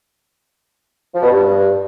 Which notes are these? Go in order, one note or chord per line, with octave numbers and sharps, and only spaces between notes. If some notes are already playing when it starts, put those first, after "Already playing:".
F3
B2
G2